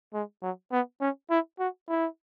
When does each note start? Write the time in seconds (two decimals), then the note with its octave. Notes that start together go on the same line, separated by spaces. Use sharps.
0.14 G#3
0.42 F#3
0.72 B3
1.01 C#4
1.30 E4
1.59 F#4
1.89 E4